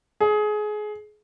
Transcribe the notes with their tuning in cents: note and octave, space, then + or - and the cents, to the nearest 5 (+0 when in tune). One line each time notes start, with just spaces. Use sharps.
G#4 +25